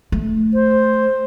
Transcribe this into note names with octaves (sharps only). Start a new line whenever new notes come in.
A3
C5